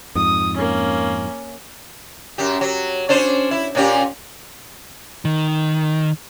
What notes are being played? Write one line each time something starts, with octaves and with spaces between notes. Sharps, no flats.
F2 G#2 D#6
A#3 C#4
F#2 G4
F#3
C#4 D4 C5
E4
A#2 C#4 G4
D#3